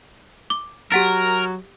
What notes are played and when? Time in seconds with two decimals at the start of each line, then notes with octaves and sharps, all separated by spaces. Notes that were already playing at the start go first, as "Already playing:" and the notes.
0.50 D6
0.92 F#3 G4 A#4 F#5 A6